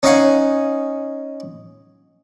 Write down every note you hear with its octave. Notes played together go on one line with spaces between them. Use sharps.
C#4 D#4 D#5 F5 F#5 G#5